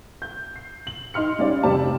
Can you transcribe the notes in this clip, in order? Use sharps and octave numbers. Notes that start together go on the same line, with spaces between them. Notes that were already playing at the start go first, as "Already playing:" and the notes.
G6
C7
F#7
D#4 C6 F6 C#7
G3 C#4 D#4 D5 F5
F1 C3 D#3 G3 D5 A5